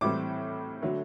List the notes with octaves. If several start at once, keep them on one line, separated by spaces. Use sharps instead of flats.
A2 E3 G3 C4 D6
D3 F#3 A3